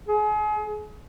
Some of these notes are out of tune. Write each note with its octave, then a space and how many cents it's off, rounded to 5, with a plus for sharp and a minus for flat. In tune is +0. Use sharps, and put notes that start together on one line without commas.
G#4 +35